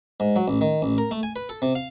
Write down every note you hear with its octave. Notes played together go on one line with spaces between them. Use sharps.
G#2
F#3
A1
D#3
A1
A#4
A3
G#5
B4
A4
C3
F5